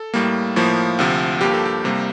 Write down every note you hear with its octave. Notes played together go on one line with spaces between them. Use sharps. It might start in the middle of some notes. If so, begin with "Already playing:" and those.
Already playing: A4
A2 G3 A#3
A2 F3 A#3
D2 C3 F3
G2 F3 A#3 G4
A4
G4
C2 C3 G3 A#3